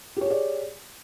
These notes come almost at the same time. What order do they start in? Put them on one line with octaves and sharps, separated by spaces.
G4 C#5 G#4 D5